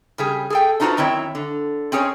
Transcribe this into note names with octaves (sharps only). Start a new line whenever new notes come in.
C#3 G3 G#4
G#4 A4 G5
D4 D#4 F4 F#4 B4 C5
F#2 D#3 C4 E4 C#5
D3
C4 C#4 G#4 C5 C#5